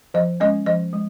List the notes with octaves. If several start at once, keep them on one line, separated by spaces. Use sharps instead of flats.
F3 D#5
G#3 C#4 D#5
F3 D#5
G#3